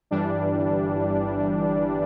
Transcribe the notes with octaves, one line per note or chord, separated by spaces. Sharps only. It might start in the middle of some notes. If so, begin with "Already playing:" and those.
G1 G2 E3 G3 D4